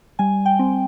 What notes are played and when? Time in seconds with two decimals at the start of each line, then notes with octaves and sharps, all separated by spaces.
0.19 G3 G#5
0.46 G5
0.59 C4